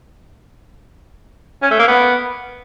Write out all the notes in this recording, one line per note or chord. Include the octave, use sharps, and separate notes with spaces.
C#4
A3
A#3
B3